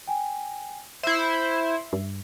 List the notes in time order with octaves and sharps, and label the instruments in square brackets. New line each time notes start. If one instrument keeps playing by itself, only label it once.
[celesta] G5 G#5
[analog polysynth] E4 C5 [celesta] E5 E6 C7
[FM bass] G2